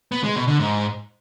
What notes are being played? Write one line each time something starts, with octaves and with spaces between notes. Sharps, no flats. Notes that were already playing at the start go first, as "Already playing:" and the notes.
B3
G#3
B2
D3
G#2